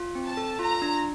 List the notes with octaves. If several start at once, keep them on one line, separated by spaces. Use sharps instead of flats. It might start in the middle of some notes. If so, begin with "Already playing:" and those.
Already playing: F4
C4
A5
A4
F4 A#5
D4